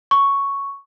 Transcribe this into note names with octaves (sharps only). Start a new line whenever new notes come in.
C#6